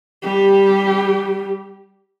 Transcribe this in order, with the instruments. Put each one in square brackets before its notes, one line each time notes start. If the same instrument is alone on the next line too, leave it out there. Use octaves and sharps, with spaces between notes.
[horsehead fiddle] G3 G4